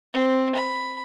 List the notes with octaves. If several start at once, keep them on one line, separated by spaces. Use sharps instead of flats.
C4
B5